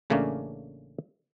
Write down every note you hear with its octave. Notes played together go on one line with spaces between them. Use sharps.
A1 C#3 A3 A#3 C#4 D4